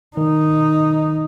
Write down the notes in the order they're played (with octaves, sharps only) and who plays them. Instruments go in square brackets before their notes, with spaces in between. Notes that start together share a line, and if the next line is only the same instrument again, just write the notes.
[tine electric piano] D#3 [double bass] D#4